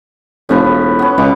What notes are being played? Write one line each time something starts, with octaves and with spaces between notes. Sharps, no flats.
F1 A2 F3 B4
E1
B3 C#4
C#2 B2 D6